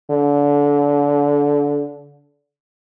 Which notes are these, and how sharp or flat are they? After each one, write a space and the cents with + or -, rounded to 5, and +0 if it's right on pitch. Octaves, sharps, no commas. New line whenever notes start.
D3 -25